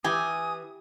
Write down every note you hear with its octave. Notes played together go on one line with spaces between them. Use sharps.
E3 G4 G#5 D#6